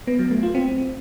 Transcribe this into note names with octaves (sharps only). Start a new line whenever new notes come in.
B3
F#3
A3
F4
C4